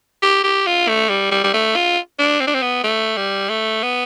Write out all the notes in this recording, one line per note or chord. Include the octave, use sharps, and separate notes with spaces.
G4
G4
F4
A3
G3
G3
G3
A3
F4
D4
C4
D4
C4
B3
A3
G3
A3
B3